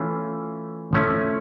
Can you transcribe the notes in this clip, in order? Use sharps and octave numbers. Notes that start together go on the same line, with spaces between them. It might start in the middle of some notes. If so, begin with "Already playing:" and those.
Already playing: E3 A3 C#4 F4
F3 A3 C#4 E4